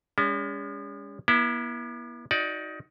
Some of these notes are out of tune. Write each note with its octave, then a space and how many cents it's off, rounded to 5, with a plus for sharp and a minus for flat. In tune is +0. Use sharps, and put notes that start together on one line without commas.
G#3 -40 C#4 +40
B3 -45 E4 +0
D#4 +20 F#4 +0 D5 +0